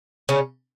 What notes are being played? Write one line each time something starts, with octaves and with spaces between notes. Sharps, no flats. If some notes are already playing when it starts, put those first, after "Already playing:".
C#3 C#4